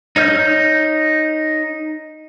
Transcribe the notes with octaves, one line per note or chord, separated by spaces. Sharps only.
D#4 C#5 F6 G6